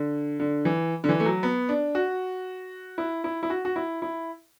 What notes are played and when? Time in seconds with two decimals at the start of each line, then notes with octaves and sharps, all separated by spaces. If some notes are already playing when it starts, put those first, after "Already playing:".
Already playing: D3
0.40 D3
0.65 E3
1.04 D3
1.09 E3
1.20 A3
1.26 F#3
1.43 B3
1.69 D4
1.95 F#4
2.98 E4
3.24 E4
3.43 E4
3.50 F#4
3.65 F#4
3.76 E4
4.02 E4